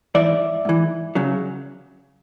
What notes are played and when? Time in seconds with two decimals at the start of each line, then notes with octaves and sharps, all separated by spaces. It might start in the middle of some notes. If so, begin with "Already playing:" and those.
0.15 G#2 E3 D5 E5
0.65 G#2 E3
1.15 C#3 F#3